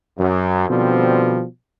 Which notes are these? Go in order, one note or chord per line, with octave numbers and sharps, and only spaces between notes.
F#2
B2 D3 F3 G3 C4